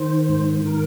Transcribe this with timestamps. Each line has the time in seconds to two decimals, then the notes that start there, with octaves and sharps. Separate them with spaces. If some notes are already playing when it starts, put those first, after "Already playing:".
Already playing: D#3 C5
0.29 G#2
0.65 D#3 A#4